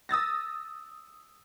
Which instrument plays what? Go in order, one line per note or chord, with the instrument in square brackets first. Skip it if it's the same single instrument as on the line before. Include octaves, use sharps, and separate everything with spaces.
[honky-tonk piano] D#6 E6 A6 A#6